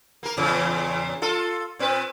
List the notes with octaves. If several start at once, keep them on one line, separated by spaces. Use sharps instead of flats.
A#3 A#4
E2 A#2 C#3
F4 A4
A#2 C4 B4